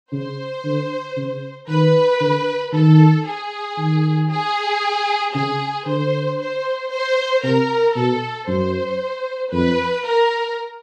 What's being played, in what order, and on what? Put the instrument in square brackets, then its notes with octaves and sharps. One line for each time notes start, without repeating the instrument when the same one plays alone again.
[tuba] C#3 [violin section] C5
[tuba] D3
C#3
[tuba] D#3 [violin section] B4
[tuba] D3
[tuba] D#3 [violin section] A4
[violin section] G#4
[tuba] D#3
[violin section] G#4
[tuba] C#3 [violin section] G#4
[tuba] D3 [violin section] C5
[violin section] C5
C5
[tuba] C3 [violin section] A#4
[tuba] B2 [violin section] A4
[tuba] F#2 [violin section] C5
[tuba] F2 [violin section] B4
[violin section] A#4